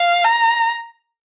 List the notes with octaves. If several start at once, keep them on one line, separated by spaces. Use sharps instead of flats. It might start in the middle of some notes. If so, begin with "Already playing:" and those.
Already playing: F5
A#5